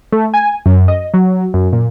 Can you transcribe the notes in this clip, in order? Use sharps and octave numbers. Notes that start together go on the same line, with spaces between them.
A3
G#5
F#2
D#5
F#3
F#2
A#2